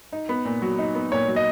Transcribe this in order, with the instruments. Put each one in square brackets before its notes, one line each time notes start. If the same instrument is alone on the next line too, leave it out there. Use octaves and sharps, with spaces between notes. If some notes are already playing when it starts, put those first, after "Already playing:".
[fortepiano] D#4
B3
A#2
F#3
D#4
B3
[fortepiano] A#2 [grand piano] C#5
[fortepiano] F#3
[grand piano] D#5